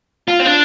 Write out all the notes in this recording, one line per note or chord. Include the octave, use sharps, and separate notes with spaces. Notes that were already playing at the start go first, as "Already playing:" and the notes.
F4
C4
D4